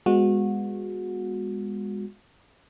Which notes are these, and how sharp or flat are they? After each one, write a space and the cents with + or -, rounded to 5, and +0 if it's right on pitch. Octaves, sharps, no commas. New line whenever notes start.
G#3 -25 B3 +0 F#4 -25